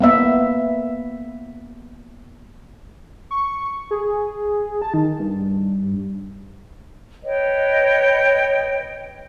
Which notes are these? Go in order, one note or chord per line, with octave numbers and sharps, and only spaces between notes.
A#3 B3 E5
C#6
G#4
A5
D#3
G2
B4 C#5 D#5 G5